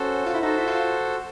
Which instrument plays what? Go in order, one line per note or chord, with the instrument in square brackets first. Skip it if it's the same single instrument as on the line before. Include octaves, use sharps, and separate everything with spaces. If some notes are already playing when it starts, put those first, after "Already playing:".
Already playing: [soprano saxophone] C#4 [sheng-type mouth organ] F#4 A4 C5
[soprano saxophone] F4
E4
[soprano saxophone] D#4 [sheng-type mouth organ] F#4 A4 C5
[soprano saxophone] E4
F4